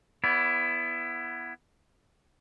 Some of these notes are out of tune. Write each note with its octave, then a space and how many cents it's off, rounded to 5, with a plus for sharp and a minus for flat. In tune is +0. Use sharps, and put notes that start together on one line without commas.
B3 +0 E4 +20 D5 -30